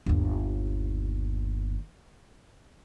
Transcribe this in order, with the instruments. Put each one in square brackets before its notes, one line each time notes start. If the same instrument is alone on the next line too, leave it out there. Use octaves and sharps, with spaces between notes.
[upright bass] G1 D#2